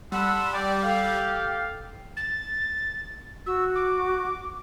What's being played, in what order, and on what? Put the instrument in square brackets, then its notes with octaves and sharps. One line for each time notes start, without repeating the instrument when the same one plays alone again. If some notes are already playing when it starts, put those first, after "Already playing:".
[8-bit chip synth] G3 [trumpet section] A4 F#5 [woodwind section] B5 C6 E6
[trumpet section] G4 [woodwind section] D5
[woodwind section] A4 F5
[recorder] A6
[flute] F#4 [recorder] E6
[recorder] D6